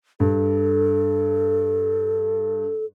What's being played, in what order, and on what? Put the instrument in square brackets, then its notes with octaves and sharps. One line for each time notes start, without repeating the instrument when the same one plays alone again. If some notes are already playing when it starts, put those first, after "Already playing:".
[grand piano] G2 [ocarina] A4